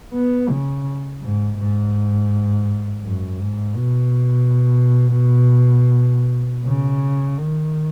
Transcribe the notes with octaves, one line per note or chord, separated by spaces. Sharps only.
B3
C#3
G#2
G#2
F#2
G#2
B2
C#3
D#3